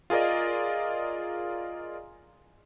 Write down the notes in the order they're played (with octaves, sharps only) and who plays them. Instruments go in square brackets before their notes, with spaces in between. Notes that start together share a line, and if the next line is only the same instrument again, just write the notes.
[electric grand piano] F4 G#4 A#4 D5 D#5